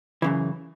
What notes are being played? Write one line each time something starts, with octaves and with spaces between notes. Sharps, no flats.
F#2 C#3 E3